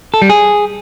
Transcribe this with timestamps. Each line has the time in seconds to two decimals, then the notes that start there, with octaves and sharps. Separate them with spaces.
0.14 A4
0.22 G3
0.30 G#4